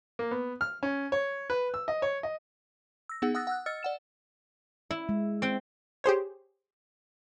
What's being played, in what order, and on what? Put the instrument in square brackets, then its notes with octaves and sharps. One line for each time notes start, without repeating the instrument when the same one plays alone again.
[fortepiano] A#3
B3
F6
C#4
C#5
B4
E6
D#5
C#5
D#5
[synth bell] E6 A#6
B3 D#4 G#4 F#5
F#5 D#6 E6 F#6 A6 A#6
F#5 E6 F#6
D#5 E6 F6 A6 C#7
D5 F#5 E7
[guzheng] E4 [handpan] E5
[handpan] G#3
[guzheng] C4 G5
[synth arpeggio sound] G4 G#4 C5 C#5